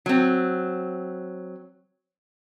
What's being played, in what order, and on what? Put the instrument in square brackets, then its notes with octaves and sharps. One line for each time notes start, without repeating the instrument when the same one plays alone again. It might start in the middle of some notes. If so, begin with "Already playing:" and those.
[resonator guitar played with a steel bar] F#3 C4